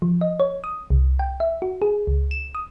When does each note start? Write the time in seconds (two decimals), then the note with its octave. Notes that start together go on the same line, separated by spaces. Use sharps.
0.02 F3
0.21 D#5
0.40 C#5
0.64 D#6
0.90 C2
1.19 G5
1.40 E5
1.62 F#4
1.82 G#4
2.07 C#2
2.31 E7
2.55 D#6